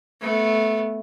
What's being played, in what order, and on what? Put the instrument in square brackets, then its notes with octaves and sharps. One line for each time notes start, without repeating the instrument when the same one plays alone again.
[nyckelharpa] A3 B3